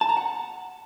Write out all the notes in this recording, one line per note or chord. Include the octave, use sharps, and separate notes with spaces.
A5
A#5
F#5